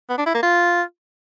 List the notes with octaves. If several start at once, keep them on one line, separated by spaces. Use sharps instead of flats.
B3
D4
E4
A#3
F4